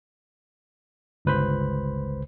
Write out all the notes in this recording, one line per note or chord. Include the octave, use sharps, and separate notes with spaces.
G1 C#2 B4 C5 B5